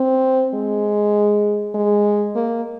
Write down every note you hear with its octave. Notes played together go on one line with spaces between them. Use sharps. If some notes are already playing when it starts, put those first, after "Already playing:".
Already playing: C4
G#3
G#3
A#3